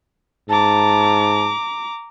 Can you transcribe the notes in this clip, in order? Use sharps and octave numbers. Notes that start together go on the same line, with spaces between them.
G#2 A5 A#5 D6